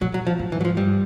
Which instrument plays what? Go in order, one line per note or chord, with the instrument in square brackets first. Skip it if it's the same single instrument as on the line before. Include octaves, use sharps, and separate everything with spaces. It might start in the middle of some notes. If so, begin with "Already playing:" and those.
[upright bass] A#2 [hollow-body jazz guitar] F#3
[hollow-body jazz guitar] F#3
F3
[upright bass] G#2
[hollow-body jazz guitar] E3
F#3
F3
[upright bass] G2 [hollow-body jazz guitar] G3